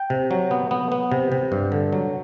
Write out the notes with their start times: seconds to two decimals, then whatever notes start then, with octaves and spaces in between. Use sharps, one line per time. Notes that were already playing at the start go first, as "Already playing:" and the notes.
Already playing: G5
0.10 C3
0.31 F#3
0.51 B3
0.71 B3
0.92 B3
1.12 C3
1.32 C3
1.52 G2
1.72 D3
1.93 F#3